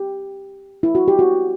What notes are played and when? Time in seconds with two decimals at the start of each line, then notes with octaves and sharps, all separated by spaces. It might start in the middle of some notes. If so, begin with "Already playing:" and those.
Already playing: G4
0.83 E4
0.95 F#4
1.08 G4
1.19 F#4